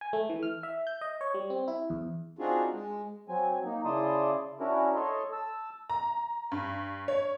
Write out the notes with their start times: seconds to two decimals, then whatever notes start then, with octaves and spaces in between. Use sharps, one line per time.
0.01 G#5
0.13 A3
0.30 E3
0.43 F6
0.63 E5
0.87 G6
1.01 D#5
1.21 C#5
1.34 G3
1.50 C4
1.68 E4
1.90 E2
2.39 C4 D4 D#4 F4 F#4 G#4
2.73 G#3
3.29 F#3 C4 G#5
3.65 A#3 D#4
3.85 C#3 E4 D5 A5 C6 D#6
4.60 C#4 D4 E4 F#4 A#4
4.95 A4 C#5 D#5 C6
5.33 A5 E6
5.90 A#5
6.52 G2
7.08 C#5